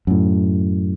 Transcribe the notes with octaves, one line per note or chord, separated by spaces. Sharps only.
F#2 A2